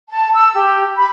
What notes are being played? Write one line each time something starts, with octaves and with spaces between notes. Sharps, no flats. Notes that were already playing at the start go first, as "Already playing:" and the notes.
A5
E6
G4
B5